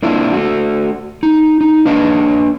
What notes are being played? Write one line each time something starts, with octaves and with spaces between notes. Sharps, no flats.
A#3 C4 D4 E4 F4
A3 F#4
D#4
D#4
A#3 D4 B4 D#5 F5 A5